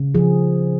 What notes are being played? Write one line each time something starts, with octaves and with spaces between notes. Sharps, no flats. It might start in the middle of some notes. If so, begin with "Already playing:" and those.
Already playing: C#3
F3 G#4